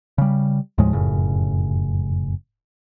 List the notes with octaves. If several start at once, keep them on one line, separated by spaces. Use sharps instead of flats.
C#3 G3
D#2 A2 F3 G#3
F1 F#2 A2 C#3